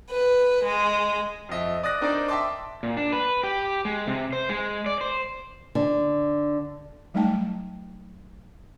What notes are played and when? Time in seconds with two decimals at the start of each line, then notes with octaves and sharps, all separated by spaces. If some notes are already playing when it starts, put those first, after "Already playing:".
0.10 B4
0.65 G#3
1.49 F2 F3 D#5 E5
1.83 D5 D#6 F#6 A#6
2.01 C4 D4 D#4 A#4 C5 D5
2.28 E5 G5 A5 C6 D6
2.83 A#2
2.97 D4
3.12 B4
3.43 G4
3.85 G#3
4.07 C3
4.33 C5
4.49 G#3
4.86 D5
5.01 C5
5.75 D3
7.14 F#3 G3 A3 D#4 G5 A5